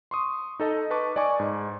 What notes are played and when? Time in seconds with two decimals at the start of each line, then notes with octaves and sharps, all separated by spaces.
0.11 C6 C#6 D#6
0.60 D#4 A4 D#5 A5
0.91 B4 A5 C#6 D6
1.16 D5 D#5 G#5 C#6 D6
1.40 G#2